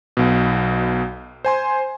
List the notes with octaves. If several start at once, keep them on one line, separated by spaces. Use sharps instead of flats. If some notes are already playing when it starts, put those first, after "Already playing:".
B1 B2
C5 G#5 C6